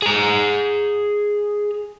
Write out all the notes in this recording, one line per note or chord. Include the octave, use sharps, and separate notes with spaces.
G#4 A#5